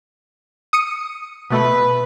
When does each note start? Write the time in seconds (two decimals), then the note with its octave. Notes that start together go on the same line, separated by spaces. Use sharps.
0.73 D#6 C#7 D#7
1.50 B2 A3 B4